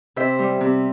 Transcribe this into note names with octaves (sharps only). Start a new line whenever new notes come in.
C3 C5 E5
G3
C3